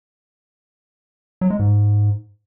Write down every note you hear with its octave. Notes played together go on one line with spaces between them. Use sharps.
F#3
G#3
G#2